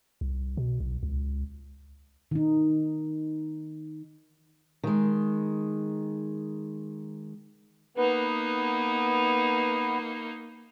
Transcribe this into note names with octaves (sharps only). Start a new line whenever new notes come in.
C2
B2
B1
C#2
D#3 D#4
D#3 G#3
A#3 B3 D#4 B4